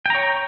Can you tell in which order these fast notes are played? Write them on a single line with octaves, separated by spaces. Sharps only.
G5 A#5 C#5